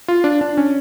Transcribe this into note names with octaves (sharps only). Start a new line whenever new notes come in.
F4
D4
D4
C#4